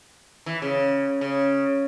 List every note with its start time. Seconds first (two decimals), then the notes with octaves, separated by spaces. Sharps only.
0.46 E3
0.62 C#3
1.21 C#3